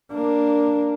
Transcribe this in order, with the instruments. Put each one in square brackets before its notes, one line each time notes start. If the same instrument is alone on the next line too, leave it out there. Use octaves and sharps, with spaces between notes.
[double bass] A#3 D4